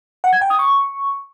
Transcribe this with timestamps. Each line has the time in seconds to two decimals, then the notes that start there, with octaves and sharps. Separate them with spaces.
0.24 F#5
0.33 G#6
0.41 G5
0.50 D#6
0.59 C#6